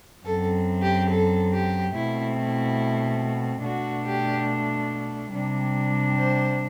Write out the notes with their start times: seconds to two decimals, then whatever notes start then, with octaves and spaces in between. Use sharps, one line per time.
0.25 F#2 F#3 C4 A4
0.82 G4
1.09 A4
1.51 G4
1.94 B2 A3 C4 E4
2.37 E4
3.63 B2 A3 D4 F#4
4.05 G4
5.32 C3 G3 D4
6.17 C5